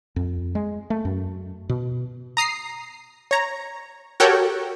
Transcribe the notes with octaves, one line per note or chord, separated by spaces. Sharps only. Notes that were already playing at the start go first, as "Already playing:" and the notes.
F2
G#3
A3
F#2
B2
A#5 D#6 C7
C#5 A#5
F#4 G4 A4 A#4 C#5 G5